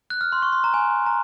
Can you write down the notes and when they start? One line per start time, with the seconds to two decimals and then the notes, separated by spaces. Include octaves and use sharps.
0.10 F#6
0.21 F6
0.32 C6
0.42 C#6
0.52 C6
0.64 A#5
0.74 G#5
1.06 A#5